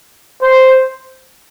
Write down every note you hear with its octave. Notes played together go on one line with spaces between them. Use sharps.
C5